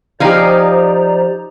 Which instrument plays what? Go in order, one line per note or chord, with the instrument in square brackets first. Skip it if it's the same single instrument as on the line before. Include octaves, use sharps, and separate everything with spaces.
[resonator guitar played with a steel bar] F3 G4 [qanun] D#4 F5 G#5 [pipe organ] C5 D5 A#5